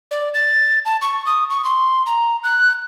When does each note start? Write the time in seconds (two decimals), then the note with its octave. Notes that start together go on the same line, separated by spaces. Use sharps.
0.11 D5
0.34 A6
0.85 A5
1.02 C#6
1.26 D#6
1.50 C#6
1.64 C6
2.06 A#5
2.44 F#6